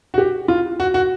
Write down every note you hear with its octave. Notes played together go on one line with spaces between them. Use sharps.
F#4
G4
F4
F#4
F#4